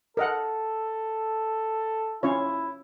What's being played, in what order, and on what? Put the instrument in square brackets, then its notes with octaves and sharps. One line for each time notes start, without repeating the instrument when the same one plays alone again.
[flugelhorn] A4 [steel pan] A#4 D#5 F#5
[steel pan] C#4 F4 C#5 [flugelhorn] E4